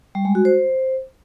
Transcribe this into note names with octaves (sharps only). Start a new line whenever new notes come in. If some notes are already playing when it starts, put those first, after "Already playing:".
G3
G#3
F#4
C5